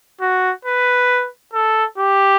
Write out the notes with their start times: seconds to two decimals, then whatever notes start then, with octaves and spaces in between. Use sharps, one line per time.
0.21 F#4
0.65 B4
1.54 A4
1.98 G4